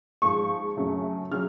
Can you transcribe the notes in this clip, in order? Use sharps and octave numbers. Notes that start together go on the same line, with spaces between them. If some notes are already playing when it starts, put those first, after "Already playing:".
G#2 F3 G#3 C#6
F#2 C#3 F#3 A3
C#3 F#3 F6